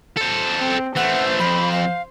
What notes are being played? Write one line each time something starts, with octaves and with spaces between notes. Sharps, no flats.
A4 C5
C4
E3 A3 C5 F#5
F2 B5
F5